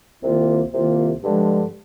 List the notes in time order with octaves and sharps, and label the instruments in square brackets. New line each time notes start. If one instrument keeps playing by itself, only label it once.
[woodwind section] C2 C3 D#3 A#3 F4
C2 C3 D#3 A#3 F4
G2 D3 F3 G#3